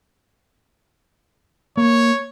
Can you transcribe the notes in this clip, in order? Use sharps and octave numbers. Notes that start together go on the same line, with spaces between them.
A#3 C#5